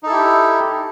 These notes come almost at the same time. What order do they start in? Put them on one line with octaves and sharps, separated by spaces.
D#4 A4 E4 G4